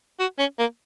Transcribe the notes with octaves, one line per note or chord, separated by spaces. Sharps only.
F#4
C#4
A#3